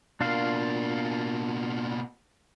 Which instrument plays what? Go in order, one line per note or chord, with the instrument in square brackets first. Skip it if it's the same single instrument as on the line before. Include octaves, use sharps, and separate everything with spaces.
[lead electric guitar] B2 A#3 [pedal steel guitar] D4 F4 F5